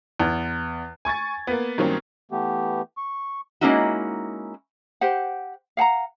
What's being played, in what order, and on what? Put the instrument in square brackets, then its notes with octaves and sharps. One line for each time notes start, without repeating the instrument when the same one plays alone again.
[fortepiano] E2
[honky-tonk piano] G#5 C#6 G#6 A6
A#3 B3
G2 D#3 F#3 A#3 C4 C#4
[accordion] E3 A3 B3 G4
C#6
[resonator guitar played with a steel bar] G#3 A#3 C#4 D#4 E4 F#4
[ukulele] G4 C5 F#5
F5 F#5 A5 A#5